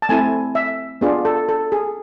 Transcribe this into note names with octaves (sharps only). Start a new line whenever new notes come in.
A5
A3 C4 E4 G#5
E5
B3 D4 F4 G#4
A4
A4
G#4